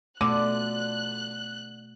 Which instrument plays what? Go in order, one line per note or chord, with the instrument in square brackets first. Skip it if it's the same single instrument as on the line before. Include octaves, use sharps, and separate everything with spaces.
[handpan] B2 A3 [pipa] D3 [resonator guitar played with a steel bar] F3 D4 [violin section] F#6